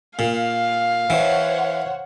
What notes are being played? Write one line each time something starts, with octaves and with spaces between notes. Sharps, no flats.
A#2 F5
E3 C5 C#5 F#5